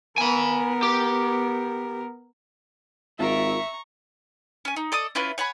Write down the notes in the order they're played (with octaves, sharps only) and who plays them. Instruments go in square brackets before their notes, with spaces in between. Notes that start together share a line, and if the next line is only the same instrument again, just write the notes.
[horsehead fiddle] B3 A#4 [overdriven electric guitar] G#5 B5
[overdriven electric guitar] G4
[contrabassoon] G#1 [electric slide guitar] F4 A#4 [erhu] E5 [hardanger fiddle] A#5 C#6
[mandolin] C#4 G#5
D#4
A4 D5 D#5 D#6
C#4 E4 F4 B4
C#5 F#5 G#5 B5